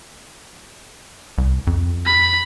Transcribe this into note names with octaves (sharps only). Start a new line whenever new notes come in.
C2
F2
B5